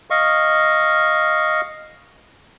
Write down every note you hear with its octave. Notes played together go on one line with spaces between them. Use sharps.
D#5 F5 C#6